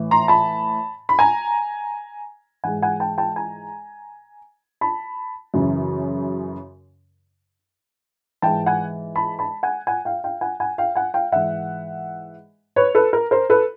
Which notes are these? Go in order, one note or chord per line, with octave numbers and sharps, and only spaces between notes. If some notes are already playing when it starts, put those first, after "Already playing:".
Already playing: A2 E3
A#5 C6
A5 B5
B5
G#5 A#5
G#2 E3 F#5 G#5
F#5 G#5
G5 A5
G5 A5
G#5 A#5
A5 B5
F#2 C#3 E3
G#2 E3 G5 A5
F#5 G#5
A5 B5
A5 B5
F#5 G#5
F#5 G#5
F5 G5
F5 G5
F#5 G#5
F#5 G#5
F5 G5
F#5 G#5
F5 G5
G#2 E3 E5 F#5
B4 C#5
A4 B4
A#4
A#4 C5
A4 B4